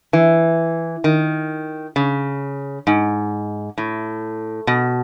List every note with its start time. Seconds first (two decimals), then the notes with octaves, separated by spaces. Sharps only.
0.13 E3
1.04 D#3
1.96 C#3
2.87 G#2
3.78 A2
4.67 B2